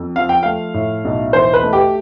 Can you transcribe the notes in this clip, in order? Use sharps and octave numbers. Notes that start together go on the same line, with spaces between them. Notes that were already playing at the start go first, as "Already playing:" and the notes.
Already playing: F2
F3 F5
G5
A3 F5
A2
B1
E3 C5
B4
A3
G4